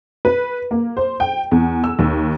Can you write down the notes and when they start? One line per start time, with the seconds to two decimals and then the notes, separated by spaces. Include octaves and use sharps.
0.25 B4
0.71 A#3
0.97 C5
1.20 G5
1.51 E2
1.84 E6
1.99 D#2